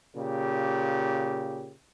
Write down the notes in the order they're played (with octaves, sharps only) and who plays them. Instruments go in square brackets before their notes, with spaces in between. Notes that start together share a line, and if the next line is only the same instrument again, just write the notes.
[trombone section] A#2 C#3 G4